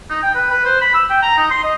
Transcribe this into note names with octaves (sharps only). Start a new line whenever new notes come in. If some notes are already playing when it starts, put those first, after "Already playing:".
D#4
G5
B4
B4
C5
B5
E6
G5
A#5
D#4
C6
D#5